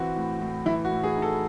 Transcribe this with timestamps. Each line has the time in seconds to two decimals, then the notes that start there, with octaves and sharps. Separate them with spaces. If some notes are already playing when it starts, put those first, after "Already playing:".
Already playing: E3 C4 F#4
0.16 A2
0.41 A2
0.66 E3 E4
0.85 F#4
0.91 A2
1.04 G#4
1.16 D#4
1.22 A4